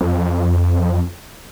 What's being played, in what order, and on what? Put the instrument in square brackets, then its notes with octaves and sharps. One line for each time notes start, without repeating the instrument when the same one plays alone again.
[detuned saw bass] F2